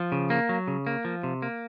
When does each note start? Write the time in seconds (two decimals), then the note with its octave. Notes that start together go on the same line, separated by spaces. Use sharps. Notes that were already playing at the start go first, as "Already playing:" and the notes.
Already playing: F3
0.12 C#3
0.30 A#3
0.49 F#3
0.68 C#3
0.87 A#3
1.05 F3
1.23 C3
1.42 A#3